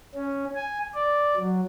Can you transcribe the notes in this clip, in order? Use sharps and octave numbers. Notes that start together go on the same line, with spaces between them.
C#4
G#5
D5
F#3